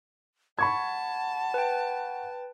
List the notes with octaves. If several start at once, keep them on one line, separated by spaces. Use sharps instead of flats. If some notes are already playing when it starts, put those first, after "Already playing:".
F#5 A5 B5 C#6 G#6
B4 G5